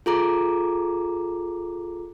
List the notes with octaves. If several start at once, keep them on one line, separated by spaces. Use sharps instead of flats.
F4 G#4 A4 A#5 D6